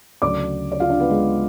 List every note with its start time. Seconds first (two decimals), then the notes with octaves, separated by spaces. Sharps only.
0.22 D2 C#3 F#3 D5 D6
0.72 D5
0.80 F4 F5
0.90 D4 D5
1.00 B3 B4
1.09 G#3 G#4